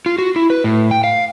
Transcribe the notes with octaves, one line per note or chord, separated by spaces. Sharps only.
F4
F#4
E4
B4
A2
G5
F5